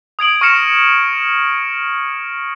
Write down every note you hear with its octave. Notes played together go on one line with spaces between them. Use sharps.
D#6 G#6 D7 F#7
C#6 F6 A#6 C#7 E7